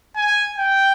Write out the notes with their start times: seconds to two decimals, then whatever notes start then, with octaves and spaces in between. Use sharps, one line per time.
0.16 G#5
0.58 G5